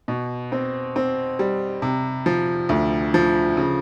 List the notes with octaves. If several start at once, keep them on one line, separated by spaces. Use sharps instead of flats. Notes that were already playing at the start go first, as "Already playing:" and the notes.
B2
C4
C4
G3
C3
F3
D2
F3
C#3